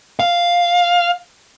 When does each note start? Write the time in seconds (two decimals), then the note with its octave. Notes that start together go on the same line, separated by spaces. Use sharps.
0.19 F5